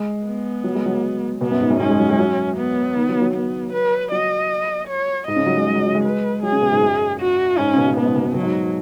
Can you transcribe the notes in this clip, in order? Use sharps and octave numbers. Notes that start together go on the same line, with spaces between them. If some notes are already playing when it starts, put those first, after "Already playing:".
Already playing: G#3
B3
F#3
G#3
F#3
B2 B3
F#2
G#2
F#2
G#2 C#4
G#3
F#3
G#3
F#3
B3
D#3
F#3
F#3
B3
B4
F#3 D#5
C#5
G#2 D#5
C#3
F#3
G#3
G#3
F#3
F#3
G#3
B4
F#3 G#4
C#3
B2
G#2
F#2
F#4
G#2 C#4
C#3
B2
G#2
B2 B3
G#2
B2
G#2
B2 F#3
G#2